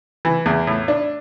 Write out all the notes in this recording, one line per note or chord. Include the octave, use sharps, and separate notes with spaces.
E3
E2
A2
D4